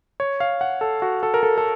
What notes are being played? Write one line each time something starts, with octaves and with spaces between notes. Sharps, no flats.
C#5
F5
F#5
A4
F#4
A4
A#4
A4
A4